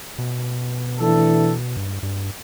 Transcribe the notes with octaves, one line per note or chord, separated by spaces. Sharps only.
B2
E3 A3 D4 A4
G2
G2